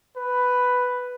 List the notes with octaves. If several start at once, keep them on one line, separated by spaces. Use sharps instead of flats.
B4